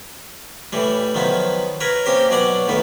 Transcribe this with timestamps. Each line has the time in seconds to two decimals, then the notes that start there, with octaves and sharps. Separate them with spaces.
0.73 A2 E3 G3
1.15 D#3 F3 F#3 B3
1.81 A#4 B4 C#5
2.06 A#3 C4 C#4 G4 C5
2.31 B2 F#3 D5 F#5
2.68 B1 A2 D#3 B3